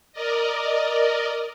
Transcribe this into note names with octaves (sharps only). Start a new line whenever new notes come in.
A#4 D5 D#5